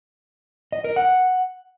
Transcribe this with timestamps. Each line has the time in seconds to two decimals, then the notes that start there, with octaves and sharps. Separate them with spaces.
0.72 D#5
0.84 A#4
0.96 F#5